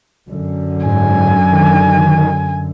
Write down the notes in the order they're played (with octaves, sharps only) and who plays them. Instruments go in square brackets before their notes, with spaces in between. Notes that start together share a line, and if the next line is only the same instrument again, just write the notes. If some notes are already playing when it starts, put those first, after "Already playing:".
[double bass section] F#2 D3
[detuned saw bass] G#2 [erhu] G#5
[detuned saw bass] D#3